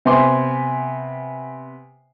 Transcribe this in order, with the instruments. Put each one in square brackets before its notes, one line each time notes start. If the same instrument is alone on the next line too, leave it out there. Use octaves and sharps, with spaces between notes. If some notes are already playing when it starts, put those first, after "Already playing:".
[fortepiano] C3 B3 C5 G#5 C6 D6